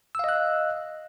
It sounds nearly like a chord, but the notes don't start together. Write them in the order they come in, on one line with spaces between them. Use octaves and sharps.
E6 F5 D#5 F#6